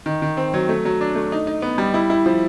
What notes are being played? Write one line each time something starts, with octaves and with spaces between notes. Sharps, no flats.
D#3
D#3
C4
F#3
A3
F#3
D4
A3
D#4
D#4
B3
G3
E4
E4
F3